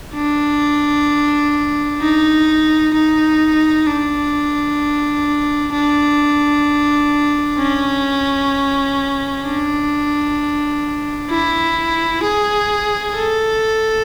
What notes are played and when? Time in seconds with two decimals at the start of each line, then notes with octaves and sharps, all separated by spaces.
0.15 D4
2.01 D#4
2.93 D#4
3.87 D4
5.72 D4
7.59 C#4
9.44 D4
11.30 E4
12.23 G#4
13.15 A4